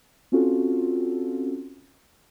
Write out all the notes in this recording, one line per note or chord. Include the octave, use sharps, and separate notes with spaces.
C4 C#4 F4 F#4 A4